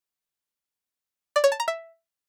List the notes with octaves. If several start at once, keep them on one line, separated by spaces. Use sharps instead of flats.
D5
C#5
A5
A#5
E5